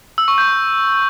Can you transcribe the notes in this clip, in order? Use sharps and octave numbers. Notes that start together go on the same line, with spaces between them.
E6
C#6
G6